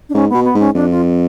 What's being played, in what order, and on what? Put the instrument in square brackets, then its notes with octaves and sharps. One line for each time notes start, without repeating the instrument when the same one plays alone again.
[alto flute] D4
[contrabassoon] G#2 [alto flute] C#4
[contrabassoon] B2 [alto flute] B3
[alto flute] B3
[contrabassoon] G#2 [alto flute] C#4
[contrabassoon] F2 [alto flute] D4
[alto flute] F4